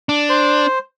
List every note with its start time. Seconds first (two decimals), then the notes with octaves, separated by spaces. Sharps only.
0.09 D4
0.29 C5